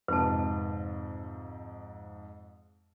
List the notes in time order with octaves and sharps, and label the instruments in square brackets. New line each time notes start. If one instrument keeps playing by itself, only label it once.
[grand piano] F2 C3 [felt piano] G#2 [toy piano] B4 A5